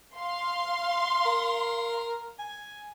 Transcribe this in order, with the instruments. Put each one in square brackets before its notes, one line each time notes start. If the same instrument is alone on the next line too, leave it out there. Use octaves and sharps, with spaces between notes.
[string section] F5 C6
[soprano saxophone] A#4
G#5